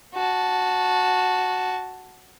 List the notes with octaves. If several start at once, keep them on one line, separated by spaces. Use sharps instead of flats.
F#4 A5